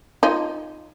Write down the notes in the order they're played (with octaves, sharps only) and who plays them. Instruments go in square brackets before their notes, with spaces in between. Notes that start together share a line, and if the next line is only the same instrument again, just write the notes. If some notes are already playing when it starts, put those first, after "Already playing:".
[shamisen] D#4 F4